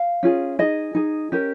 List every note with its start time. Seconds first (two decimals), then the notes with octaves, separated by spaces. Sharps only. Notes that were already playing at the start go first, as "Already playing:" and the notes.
Already playing: F5
0.23 C#4 F4 G#4
0.59 D#4 G#4 D#5
0.95 D#4 G#4
1.32 C#4 G4 A#4